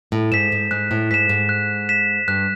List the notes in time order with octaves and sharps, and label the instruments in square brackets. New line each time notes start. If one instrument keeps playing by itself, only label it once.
[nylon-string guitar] A2
[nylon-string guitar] G#2 [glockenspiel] B6 E7
[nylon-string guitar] G#2
[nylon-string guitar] G#2 [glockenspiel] F#6
[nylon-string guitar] A2
[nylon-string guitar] G#2 [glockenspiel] B6 E7
[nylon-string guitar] G#2
[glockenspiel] F#6
B6 E7
[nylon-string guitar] G2 [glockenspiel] F#6